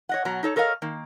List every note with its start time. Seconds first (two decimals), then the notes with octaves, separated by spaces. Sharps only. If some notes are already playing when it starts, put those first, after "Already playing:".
0.09 C#5 D#5 F#5
0.25 B2 F#3 F#4 A#5
0.43 D#4 A4 C#5
0.56 A4 A#4 C#5 D#5 F5
0.82 D#3 A#3